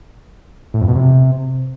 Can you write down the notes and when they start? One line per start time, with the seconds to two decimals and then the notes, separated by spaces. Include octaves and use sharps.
0.74 A2
0.81 F2
0.88 B2
0.95 C3